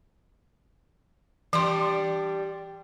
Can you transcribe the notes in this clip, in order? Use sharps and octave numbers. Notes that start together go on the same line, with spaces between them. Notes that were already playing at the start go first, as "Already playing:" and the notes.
E3 G3 D4 G4 C6